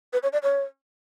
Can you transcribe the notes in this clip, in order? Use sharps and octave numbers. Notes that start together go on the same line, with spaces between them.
B4
C#5
D5
C#5